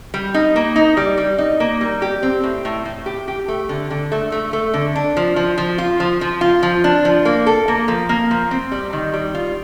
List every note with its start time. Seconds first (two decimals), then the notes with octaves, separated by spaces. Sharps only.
0.14 G3
0.34 D#4
0.56 A#3
0.76 D#4
0.97 G3
1.17 G3
1.38 D#4
1.60 A#3
1.81 G3
2.02 G4
2.23 C4
2.44 A2
2.65 A2
2.85 A2
3.06 G4
3.28 G4
3.48 A3
3.69 D3
3.90 D3
4.12 A3
4.32 A3
4.53 A3
4.74 D3
4.96 D4
5.17 F3
5.36 F3
5.58 F3
5.78 F4
6.00 F3
6.21 F3
6.41 F4
6.63 F3
6.84 D4
7.05 F3
7.25 A#3
7.47 A4
7.68 A#3
7.88 F3
8.09 A#3
8.31 F3
8.51 C4
8.71 G3
8.93 D#3
9.14 G3
9.35 F4